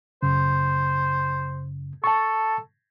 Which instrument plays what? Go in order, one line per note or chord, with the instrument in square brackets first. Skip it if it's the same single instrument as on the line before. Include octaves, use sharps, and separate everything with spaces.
[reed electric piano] F#2 C#3 [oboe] C5
[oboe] A4 [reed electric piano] A5 C#6